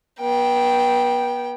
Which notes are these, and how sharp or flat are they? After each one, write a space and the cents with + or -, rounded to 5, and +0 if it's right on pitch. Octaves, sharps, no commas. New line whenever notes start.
B3 -35 G5 +0